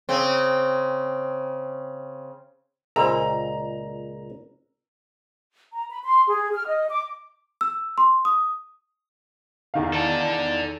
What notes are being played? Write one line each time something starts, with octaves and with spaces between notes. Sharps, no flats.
C#3 C4
C#2 A#2 G#3 G#4 A#4 C5 A#5
A#5
B5
C6
G#4
F6
D#5
D6
E6
C6
D#6
E2 D#3 F5
A4 D5